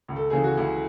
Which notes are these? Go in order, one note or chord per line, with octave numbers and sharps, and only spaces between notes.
C#2
A4
C#3 E3 G#4
F#4
C#2 E4